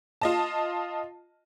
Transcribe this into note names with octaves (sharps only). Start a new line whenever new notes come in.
F4 D#5 A5